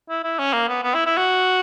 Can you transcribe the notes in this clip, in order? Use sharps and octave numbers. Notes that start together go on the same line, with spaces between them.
E4
E4
C#4
A#3
B3
B3
E4
E4
F#4